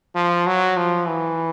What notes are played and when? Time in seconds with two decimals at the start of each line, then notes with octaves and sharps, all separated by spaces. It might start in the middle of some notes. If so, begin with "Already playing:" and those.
0.16 F3
0.47 F#3
0.77 F3
1.08 E3